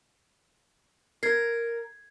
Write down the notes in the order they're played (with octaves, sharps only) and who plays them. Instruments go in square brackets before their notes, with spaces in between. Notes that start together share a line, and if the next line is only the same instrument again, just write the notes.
[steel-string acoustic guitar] A#4 [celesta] G#6 C7